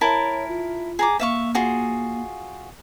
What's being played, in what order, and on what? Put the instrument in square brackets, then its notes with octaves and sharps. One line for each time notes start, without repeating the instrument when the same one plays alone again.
[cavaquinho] E4 A#4 A5 [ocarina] C#5
[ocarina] F4
[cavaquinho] G#4 A#5 D6
[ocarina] A#3 [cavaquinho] E5 F5 C#6
[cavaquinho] F4 F#4 G#4